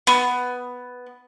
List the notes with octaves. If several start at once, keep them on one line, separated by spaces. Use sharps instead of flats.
B3